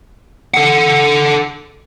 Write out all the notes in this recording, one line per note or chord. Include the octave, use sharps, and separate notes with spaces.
A4 F#5